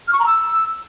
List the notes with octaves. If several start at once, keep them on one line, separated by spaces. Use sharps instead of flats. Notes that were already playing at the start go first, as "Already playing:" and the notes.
F6
C#6
A#5
E6